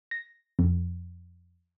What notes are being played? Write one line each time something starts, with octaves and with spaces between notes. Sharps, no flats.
A#6
F2